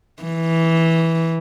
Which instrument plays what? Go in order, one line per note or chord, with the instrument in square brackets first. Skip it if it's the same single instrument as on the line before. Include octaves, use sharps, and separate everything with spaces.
[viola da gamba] E3